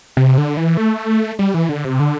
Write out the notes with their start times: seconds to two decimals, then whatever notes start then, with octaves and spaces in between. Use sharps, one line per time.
0.17 C3
0.38 D3
0.57 E3
0.77 A3
1.39 G3
1.54 E3
1.69 D3
1.85 C3
2.00 D3